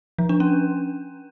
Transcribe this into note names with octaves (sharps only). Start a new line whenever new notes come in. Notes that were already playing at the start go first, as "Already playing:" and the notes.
F3
D4
C#4